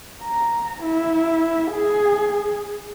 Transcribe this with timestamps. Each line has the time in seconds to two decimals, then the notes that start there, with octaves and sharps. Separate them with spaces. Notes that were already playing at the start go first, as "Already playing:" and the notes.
0.23 A#5
0.83 E4
1.72 G#4